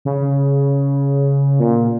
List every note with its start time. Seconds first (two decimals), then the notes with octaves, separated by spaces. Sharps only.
0.05 C#3
1.60 A#2